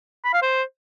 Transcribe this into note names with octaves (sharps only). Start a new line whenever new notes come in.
B5
F5
C5